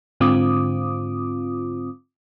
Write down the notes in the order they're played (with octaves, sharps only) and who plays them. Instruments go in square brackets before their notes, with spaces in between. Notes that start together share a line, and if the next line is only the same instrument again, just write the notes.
[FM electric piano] G#2 D3 C4 F4 D6 D#6